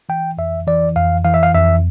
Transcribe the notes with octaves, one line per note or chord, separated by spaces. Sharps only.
E3 G5
F2 E5
E3 D5
F2 F5
E3 F5
E5
F5
F2 E5